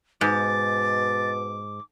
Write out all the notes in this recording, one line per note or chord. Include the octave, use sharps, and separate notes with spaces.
G#2 B2 D6 A6